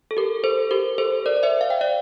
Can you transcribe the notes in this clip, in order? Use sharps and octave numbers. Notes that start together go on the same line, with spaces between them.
A4
G4 A#4
A4 C5
G4 A#4
A4 C5
A#4 D5
D5
C5 E5
F5
G5
D5 F5